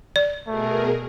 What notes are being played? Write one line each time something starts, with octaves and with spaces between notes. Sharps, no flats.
D5
B2 A3 G#4 A#4